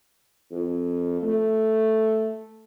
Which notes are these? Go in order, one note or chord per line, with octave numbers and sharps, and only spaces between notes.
F2
A3